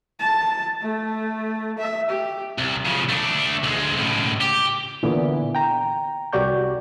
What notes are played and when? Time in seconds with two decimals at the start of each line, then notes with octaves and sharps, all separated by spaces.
0.19 A5
0.82 A3
1.78 E5
2.09 G4
2.58 C2
2.85 C#3 F3
3.09 A3 D4
3.63 D2 G#3
3.96 C#2 A2
4.41 G4
5.03 A#2 D3 E3 B3
5.55 G5 A#5
6.33 C2 F#4 G4 D5 C#6 G6